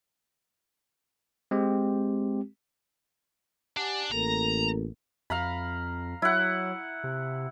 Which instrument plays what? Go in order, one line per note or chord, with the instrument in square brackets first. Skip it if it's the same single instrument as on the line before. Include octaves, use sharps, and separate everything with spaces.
[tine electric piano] G#3 C4 G4
[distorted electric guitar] D4 [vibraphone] G4 F#5 G#5
[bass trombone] A1 [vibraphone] A#3 A4 A#4 [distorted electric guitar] A#5
[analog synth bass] F2 [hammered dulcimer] F5 A#5 B5
[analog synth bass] F#3 [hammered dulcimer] E4 F#5
[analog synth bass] C3